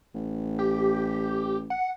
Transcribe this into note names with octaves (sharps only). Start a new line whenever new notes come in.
A1
G4
F#5